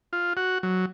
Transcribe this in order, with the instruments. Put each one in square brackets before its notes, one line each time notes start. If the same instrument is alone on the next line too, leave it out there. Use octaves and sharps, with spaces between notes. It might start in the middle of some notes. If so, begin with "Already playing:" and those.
[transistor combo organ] F4
F#4
F#3